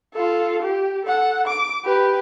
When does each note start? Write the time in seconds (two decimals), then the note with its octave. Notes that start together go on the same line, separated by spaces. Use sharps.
0.14 F4 A4
0.62 G4
1.05 A4 F#5
1.47 D6
1.85 G4 B4